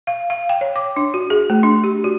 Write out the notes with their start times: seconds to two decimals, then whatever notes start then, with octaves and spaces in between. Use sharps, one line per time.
0.07 F5
0.30 F5
0.49 G5
0.61 C#5
0.76 D6
0.96 D4
1.14 F#4
1.30 G#4
1.50 A3
1.63 D4
1.84 G4
2.04 F#4